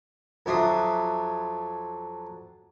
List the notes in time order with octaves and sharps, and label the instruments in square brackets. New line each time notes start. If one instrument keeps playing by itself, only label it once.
[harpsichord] F2 F#3 D4 E5 C6 D#6